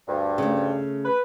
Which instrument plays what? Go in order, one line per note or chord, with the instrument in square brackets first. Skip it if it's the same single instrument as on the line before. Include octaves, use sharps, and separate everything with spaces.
[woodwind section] D2 G2
[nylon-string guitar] C#3 A3
[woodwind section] B4